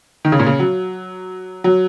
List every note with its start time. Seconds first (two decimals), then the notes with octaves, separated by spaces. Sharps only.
0.25 D#3
0.32 C#3
0.39 A#2
0.46 C#3
0.60 F#3
1.64 F#3